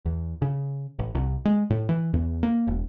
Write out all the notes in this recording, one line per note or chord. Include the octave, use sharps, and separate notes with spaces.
E2
C#3
A1
C2
G#3
A2
E3
E2
A#3
E1